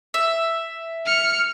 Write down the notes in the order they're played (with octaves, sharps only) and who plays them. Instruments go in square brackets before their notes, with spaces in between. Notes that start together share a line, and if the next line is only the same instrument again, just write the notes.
[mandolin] E5
[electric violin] F6 C#7